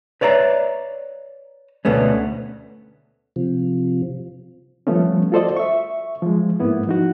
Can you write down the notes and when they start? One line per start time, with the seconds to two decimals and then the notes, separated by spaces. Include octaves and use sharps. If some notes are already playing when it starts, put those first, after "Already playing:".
0.21 B4 C#5 D5 E5 A#5
1.85 D2 B2 A3 B3 C#4
3.36 C3 F3
4.87 F3 G3 A3 B3 C#4
5.32 F4 F#4 A4 C5 D5 D#5
5.57 E5 C#6
6.22 F3 G#3
6.60 G#2 A#3 B3 E4
6.87 F3 D#4 F#4